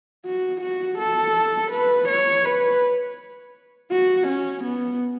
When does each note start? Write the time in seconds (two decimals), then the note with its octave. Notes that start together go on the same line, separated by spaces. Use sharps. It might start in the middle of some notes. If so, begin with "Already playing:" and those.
0.26 F#4
0.62 F#4
0.99 A4
1.72 B4
2.09 C#5
2.45 B4
3.91 F#4
4.28 C#4
4.64 B3